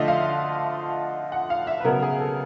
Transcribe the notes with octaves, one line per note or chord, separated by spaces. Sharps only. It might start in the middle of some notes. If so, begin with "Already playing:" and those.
Already playing: D3 F3 A3 D4 F4 D#5 E5
F5
F#5
F5
E5
B4
C#3 F#3 B3 A#4
G#4
A4